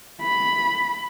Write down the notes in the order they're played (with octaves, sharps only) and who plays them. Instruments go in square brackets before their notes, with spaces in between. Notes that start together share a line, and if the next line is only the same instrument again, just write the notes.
[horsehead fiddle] B5